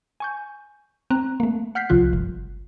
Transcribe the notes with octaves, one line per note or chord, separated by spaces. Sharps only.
G#5 C#6 G6
C4 A#5 F#6
A3 A#3
F#5 F6 G6 B6 C7
C2 C3 F3 F4 F#6
G1